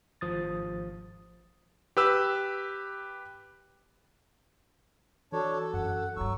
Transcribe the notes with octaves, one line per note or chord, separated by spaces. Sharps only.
G#1 F3 D#6 A6
G4 B4 E6
E3 D4 F#4 A4 C#5
F#2 F#5
G2 F#3 E4 C#6 E6